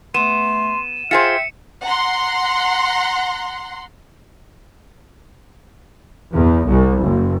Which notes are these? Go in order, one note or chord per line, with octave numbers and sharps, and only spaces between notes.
A3 B3 C6 D#7 E7
F4 G#4 C5 E5 G5 C#7
F#5 A#5 C6
E2
C2
F#1